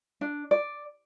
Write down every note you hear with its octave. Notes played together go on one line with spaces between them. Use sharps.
D4
D5